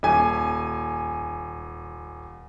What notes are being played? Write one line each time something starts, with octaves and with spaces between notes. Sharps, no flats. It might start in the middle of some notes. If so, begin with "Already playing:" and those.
D#1 G#5